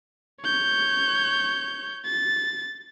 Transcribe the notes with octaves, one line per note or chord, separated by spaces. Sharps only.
C#5 G6
A6